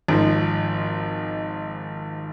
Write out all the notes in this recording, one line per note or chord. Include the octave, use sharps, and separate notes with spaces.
G#1 G#2 F3